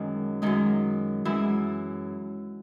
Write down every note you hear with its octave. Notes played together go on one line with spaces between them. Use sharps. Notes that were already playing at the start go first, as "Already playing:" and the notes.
Already playing: F#2 D#3 G#3 C#4
F#2 D#3 G#3 D#4
F#2 E3 G#3 E4